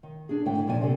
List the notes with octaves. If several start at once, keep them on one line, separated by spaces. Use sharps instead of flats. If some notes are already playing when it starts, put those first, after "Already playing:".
D#3
D4 G#4
G#2 D3 A3 E4 G5
F2 A#2 F3 D4 D5 G#5
C3 C4 D4 A4